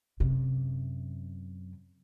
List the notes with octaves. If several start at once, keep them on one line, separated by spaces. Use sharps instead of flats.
F#2 C3